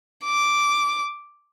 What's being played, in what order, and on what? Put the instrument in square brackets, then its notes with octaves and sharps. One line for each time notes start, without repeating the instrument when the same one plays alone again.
[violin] D6